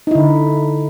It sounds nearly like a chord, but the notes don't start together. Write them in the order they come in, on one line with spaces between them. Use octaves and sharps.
D#4 E4 D3